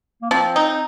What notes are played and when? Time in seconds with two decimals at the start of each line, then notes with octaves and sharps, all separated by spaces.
0.22 A#3
0.31 F3 C4
0.56 D#4